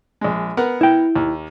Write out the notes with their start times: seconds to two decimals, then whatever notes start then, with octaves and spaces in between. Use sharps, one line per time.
0.21 A#1 G#3
0.57 B3 A#4 F#5
0.81 E4 G5
1.16 D#2